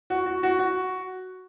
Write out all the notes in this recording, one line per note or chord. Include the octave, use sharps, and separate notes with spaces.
F#4
F#4
F#4
F#4